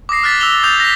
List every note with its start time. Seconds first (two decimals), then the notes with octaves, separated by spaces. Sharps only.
0.09 D6 D#6 A#6 C7
0.23 F6 F#6 A6 B6
0.40 E6 B6 F7 G7
0.63 D#6 G6 A6 F7
0.80 A#6 B6